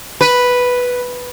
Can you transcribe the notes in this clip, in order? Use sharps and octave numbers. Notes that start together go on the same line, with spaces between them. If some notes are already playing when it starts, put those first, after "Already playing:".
B4